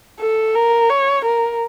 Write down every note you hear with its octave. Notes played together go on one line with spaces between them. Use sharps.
A4
A#4
C#5
A#4